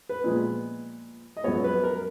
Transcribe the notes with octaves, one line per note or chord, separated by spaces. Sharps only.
B4
A#2 F3 G#3 B3
D#5
F#2 F3 G#3 B3 C#5
B4
A#4